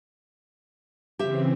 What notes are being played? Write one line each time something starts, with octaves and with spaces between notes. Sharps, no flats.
C#3 E3 C4 G4 E5